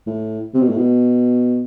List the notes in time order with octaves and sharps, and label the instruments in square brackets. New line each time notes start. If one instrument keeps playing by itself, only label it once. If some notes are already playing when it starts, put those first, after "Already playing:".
[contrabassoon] A2
C3
B2
A2
B2